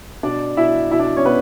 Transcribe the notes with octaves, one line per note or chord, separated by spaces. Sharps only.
B2 D4 D5
B2 E4 E5
B2 E4 E5
D4 D5
C#4 C#5
B2 B3 B4